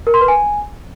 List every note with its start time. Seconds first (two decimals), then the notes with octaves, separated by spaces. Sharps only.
0.07 A#4
0.14 C6
0.21 B4
0.28 G#5